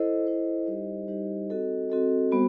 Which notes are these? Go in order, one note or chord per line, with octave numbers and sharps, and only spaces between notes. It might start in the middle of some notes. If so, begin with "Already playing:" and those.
Already playing: E4 A4 C5 D#5
E4 A4 C5 D#5
G3 D#4 G4 C5 D#5
G3 D#4 G4 C5 D#5
C4 F#4 A4 D#5
C4 F#4 A4 D#5
G3 B3 F#4 C5